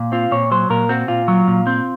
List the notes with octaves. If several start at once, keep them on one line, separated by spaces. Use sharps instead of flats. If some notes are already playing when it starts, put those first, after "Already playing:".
Already playing: A#2
C4 F4
A#2 C#5
F#3 C5
A#2 A#4
C4 F#4
A#2 F4
F#3
A#2
C4